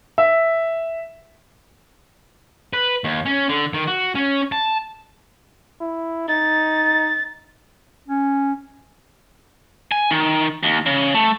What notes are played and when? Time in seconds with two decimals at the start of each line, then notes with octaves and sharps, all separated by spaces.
0.18 E5
2.73 B4
3.04 D#2
3.25 C#4
3.49 D3
3.73 D#3
3.87 F#4
4.15 C#4
4.52 A5
5.81 E4
6.29 D#4 A6
8.08 C#4
9.92 G#5
10.10 D#3
10.63 D#2
10.86 C#3
11.14 A3